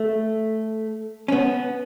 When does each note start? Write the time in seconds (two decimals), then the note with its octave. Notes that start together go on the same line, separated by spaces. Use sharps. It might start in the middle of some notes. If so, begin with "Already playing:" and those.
Already playing: A3
1.28 C#4
1.32 B3